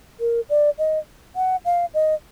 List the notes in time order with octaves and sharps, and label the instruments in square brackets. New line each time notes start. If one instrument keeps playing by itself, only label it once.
[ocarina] A#4
D5
D#5
F#5
F5
D#5